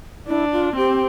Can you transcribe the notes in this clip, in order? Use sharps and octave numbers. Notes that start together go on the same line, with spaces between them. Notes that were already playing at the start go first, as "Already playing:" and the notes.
D4 E4
F4
C4 G4